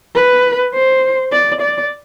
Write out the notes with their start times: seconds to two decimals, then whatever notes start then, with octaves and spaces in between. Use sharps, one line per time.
0.15 B4
0.74 C5
1.32 D5
1.61 D5